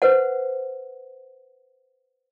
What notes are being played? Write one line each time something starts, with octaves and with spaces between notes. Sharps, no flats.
B4 C5 F#5